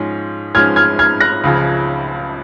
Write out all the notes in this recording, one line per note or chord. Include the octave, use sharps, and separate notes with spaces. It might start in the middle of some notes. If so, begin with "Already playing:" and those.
Already playing: G#2 F3 G#3 C#4
G#2 F3 G#3 C#4 F6 G#6
F6 G#6
F6 G#6
F#6 A#6
C#2 C#3 F3